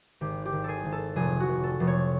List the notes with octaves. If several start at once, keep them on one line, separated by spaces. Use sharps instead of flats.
G#1 G4
G4
G#1
G#4 A4
G#1
A4
F1 G#4
F#4
F1
A4
F1
C#5